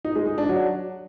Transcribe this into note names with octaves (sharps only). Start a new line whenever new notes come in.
D#4
G#3
D#4
D4
F#3